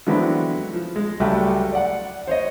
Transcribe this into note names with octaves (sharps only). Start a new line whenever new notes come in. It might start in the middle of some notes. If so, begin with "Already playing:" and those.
D3 E3 F#3 G#3 B3 C4
F3
G#3
C#2 F#3 G3 A3
D5 F#5
C5 C#5 D#5